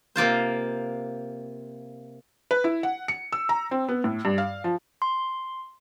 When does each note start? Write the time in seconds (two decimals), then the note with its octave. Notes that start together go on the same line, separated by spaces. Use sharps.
0.16 C3 A#3 F4 C5
2.51 B4
2.64 E4
2.83 F#5
3.08 C#7
3.32 E6
3.49 A#5
3.71 C4
3.89 B3
4.04 A2
4.25 G2
4.38 F5
4.64 F3
5.02 C6